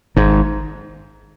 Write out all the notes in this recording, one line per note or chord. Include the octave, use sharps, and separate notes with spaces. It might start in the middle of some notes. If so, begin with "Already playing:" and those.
G#1 G#2